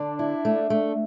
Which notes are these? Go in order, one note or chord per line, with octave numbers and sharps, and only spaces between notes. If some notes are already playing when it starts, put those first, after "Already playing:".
Already playing: D3 D4
E4
A3
A3